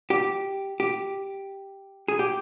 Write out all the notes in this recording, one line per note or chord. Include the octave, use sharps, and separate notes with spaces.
G4
G4
G#4
G4